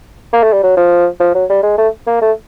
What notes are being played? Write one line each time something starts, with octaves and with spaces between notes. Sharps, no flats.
A#3
A3
G3
F#3
F3
F3
F#3
G3
G#3
A3
A#3
A3